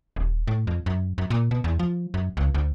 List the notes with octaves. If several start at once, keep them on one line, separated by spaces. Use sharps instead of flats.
D#1
A2
F2
F#2
F#2
A#2
B2
E2
F3
F#2
C#2
D2